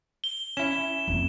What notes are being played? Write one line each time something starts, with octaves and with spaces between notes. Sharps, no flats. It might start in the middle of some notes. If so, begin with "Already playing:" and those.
G7
C#4 E4 E7
F2 A3